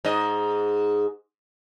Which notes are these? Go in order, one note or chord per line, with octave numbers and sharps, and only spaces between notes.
G#2 D#5